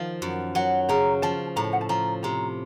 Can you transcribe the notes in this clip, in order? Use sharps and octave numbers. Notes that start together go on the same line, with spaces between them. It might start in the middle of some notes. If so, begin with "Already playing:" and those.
Already playing: D#3 F3 F5
F#2
F#3 F#5
C#3 A#5
F3 A5
A2 A#5
A5
F#5
A5
F3 A#5
C3 A#5